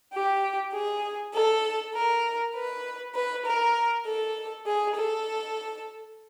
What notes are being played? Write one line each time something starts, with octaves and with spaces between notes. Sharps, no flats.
G4
G#4
A4
A#4
B4
B4
A#4
A4
G#4
A4